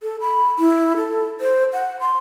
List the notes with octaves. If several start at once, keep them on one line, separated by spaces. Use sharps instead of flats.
A4
B5
E4
A4
C5
F#5
C6